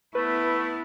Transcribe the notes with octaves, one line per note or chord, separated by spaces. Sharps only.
A3 B3 E4 B4